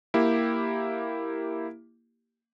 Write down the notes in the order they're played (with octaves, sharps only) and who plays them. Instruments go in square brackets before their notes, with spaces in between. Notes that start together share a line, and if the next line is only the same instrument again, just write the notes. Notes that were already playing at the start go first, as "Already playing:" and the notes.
[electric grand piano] A#3 E4 G4